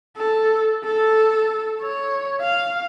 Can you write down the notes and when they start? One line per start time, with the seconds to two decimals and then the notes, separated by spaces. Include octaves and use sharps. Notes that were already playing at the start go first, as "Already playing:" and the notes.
0.17 A4
0.83 A4
1.81 C#5
2.41 F5